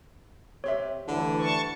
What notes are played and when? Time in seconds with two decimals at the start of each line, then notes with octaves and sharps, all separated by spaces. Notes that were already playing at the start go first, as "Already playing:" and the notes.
0.64 C3 C#5 E5
1.08 D2 G2 D3 E3
1.40 A5 C#6